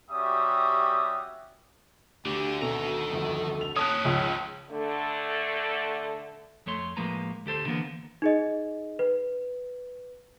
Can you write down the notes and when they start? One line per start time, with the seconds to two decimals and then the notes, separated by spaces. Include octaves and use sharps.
0.10 G3 C#4 F#4 G4 E5 D#6
2.25 D2 D3 G4
2.62 B2 D#3 A4 A#5
3.11 G1 F2
3.61 F7
3.76 D#3 C#4 C#5 A5 D#6 F#6
4.05 C#2 F3
4.71 D3 A3
6.66 F2 A3 C#5 C6
6.97 A2 F3 G#3 A#3 B4 A#5
7.46 D2 G4 A4 C5
7.66 D3 E3 A#3 B3
8.22 D#4 G#4 D#5
8.99 B4